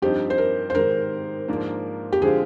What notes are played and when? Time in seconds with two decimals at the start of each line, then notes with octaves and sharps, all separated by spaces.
0.02 G2 F3 C4 D#4 G4
0.30 C5
0.38 A#4
0.70 C5
0.75 G#2 D#3 G#3 A#4
1.48 G#2 F3 A#3 D4
2.12 G4
2.22 D3 F3 G#3 C4 F4 G#4